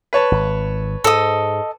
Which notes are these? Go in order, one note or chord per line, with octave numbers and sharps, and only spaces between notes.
B4 C#5 A5
G#1
G#2 A4 D#5